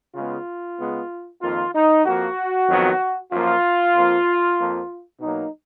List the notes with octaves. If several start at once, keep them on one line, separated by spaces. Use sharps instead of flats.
C#3 G#3 B3 F4
C#3 G#3 B3
F2 D#3 A#3 F4
D#4
F2 F3 A#3 F#4
F2 D#3 F#3 B3
F#2 F3 A#3 F4
F2 F3 A#3
F2 F3 A#3
B2 F#3 A#3 D#4